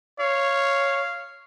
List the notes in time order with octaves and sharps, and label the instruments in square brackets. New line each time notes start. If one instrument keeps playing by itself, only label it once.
[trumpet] C#5 [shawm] F5